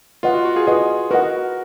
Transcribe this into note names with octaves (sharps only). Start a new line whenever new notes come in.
F4 B4 D#5 F#5
F#4
F#4
F4 G#4
F4 G#4 B4 D#5 F#5
F#4 A#4 B4 D#5 F#5